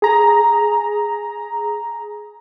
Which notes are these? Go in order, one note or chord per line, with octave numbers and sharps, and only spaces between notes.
G#4 A#5